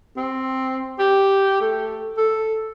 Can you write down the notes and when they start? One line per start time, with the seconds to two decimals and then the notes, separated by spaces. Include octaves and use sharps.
0.17 C4
0.99 G4
1.61 A3
2.18 A4